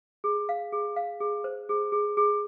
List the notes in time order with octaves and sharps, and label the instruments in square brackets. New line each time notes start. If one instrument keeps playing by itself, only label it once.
[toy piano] G#4
F5
G#4
F5
G#4
C5
G#4
G#4
G#4